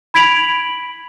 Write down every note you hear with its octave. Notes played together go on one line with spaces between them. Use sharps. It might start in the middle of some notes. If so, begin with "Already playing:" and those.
B5 G#6 B6 D7 F7 F#7